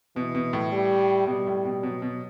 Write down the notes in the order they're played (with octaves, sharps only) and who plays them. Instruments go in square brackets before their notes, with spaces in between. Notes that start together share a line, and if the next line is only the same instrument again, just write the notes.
[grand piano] B2 [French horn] E3
[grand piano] B2
A2
[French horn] G3
[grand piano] B2 [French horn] G3
[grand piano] A2
B2
[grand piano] B2 [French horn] F#3
[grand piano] B2